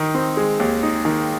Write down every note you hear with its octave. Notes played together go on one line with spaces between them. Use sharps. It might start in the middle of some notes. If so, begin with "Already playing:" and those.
Already playing: D#3 D#4
C4
G#3
D#2
D#4
D#3